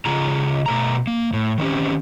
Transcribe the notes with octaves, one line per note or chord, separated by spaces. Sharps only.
C#3 F4 G#4 A#5
B2 A3 A#5
A#3
A2
D#3 C4 C#4 G4